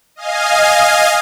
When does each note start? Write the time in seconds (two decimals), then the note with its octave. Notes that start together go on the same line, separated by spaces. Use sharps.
0.16 D#5 F5 G#5